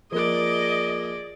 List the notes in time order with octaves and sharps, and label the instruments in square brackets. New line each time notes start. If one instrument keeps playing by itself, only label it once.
[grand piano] F3 A#3 [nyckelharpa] G#4 D5 [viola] D#5